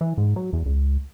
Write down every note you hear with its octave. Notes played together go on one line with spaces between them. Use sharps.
E3
G#2
F#3
E2
C#2